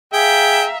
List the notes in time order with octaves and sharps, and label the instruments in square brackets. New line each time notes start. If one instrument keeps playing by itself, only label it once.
[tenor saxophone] G#4 [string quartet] E5 F5 A#5 [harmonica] G5